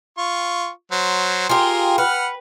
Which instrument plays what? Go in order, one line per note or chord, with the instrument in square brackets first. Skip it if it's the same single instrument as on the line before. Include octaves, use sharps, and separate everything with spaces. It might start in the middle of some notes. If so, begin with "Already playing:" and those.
[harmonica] F4 C#6
F#3 C5
[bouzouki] F4 G4 [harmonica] G#4 A#4
[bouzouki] B4 [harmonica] F#5 F6